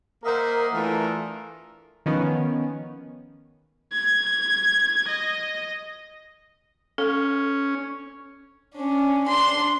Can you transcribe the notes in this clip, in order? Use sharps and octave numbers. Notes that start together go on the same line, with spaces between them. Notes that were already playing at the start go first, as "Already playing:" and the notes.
A#3 A#4 C5 D#5 E5 F#5
E3 A3 D4 F4 A4 A#4
D#3 F3 B3 C#4
G#6
D#5
C#4 A4
C#4 D4
D4 C6